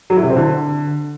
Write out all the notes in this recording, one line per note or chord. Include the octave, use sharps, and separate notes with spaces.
F#3
E4
C3
C4
D3